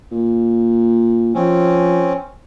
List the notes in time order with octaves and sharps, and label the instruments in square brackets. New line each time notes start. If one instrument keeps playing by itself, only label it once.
[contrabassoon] A#2
[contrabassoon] F3 [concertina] C4 C#4